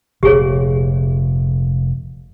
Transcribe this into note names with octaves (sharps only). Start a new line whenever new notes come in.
F1 A#2 G4 G#4 C#5